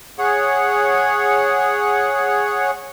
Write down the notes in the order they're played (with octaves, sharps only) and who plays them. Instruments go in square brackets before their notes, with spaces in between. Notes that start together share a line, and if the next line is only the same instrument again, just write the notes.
[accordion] G#4 C#5 F#5